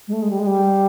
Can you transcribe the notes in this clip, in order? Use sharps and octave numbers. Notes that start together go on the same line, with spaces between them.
G#3
A3
G#3
G3
G#3
G3